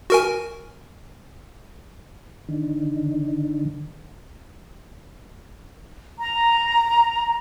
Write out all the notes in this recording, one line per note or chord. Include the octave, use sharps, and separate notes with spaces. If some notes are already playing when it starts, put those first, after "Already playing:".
F#4 A#4 G#5
D3 D#3
A#5